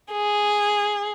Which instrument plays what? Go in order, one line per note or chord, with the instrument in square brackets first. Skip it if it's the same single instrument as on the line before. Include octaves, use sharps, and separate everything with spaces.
[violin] G#4